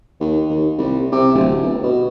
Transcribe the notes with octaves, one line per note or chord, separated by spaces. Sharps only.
D#2
D#2
C2
C3
D1
G1
B2